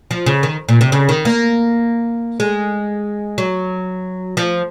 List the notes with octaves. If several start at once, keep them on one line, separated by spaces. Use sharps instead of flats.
F3
C#3
D#3
A#2
C3
C#3
D#3
A#3
G#3
F#3
F3